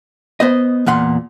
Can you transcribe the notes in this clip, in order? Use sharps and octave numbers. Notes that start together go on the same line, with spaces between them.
B3 C5 D#5
E2 A#2 F#5 C6